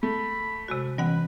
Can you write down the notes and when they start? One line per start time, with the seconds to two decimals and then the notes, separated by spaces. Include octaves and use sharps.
0.03 A3 B5
0.68 C3 G#3 F#4
0.98 E3 G3 B3 B4 F#5